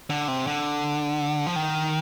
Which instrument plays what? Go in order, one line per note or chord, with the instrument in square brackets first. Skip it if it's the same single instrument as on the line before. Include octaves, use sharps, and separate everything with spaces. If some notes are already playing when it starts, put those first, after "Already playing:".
[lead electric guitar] D3
C3
D3
F3
D#3